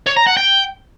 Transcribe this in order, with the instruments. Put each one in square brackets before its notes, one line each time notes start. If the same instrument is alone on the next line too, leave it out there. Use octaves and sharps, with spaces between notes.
[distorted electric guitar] C#5
A#5
F#5
G5